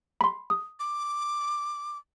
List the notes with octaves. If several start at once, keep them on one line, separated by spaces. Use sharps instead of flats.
B5 C6
D#6
D6